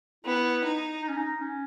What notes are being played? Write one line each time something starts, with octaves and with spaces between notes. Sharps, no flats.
B3 E4
D#4
D#4
C#4
D#4
C#4